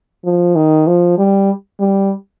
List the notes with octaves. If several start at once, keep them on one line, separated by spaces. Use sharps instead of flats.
F3
D#3
F3
G3
G3